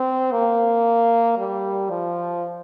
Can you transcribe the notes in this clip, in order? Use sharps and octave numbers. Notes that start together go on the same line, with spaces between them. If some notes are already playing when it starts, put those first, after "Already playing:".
Already playing: C4
A#3
G3
F3